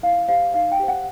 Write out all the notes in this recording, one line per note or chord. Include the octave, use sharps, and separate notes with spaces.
E4 F5
G4 C5 F5
D#4 F5
G5
G4 C5
F#5